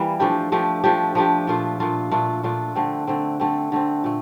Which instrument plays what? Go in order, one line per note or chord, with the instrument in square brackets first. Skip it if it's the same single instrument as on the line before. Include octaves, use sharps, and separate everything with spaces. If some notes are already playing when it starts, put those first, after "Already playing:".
Already playing: [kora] E3 G3 A#3
F3 A3 D4 G4
F3 A3 D4 G4
F3 A3 D4 G4
F3 A3 D4 G4
A#2 A3 D4 F4
A#2 A3 D4 F4
A#2 A3 D4 F4
A#2 A3 D4 F4
D3 A3 C4
D3 A3 C4
D3 A3 C4
D3 A3 C4
A#2 A3